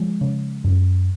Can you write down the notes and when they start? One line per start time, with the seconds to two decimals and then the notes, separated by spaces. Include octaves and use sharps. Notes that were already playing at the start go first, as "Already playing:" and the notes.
Already playing: F3 G#3
0.21 C#3
0.64 F#2